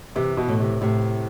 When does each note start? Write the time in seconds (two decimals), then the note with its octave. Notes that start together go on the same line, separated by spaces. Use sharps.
0.16 C3 E3
0.37 B2
0.49 A2
0.60 C3
0.81 A2 C3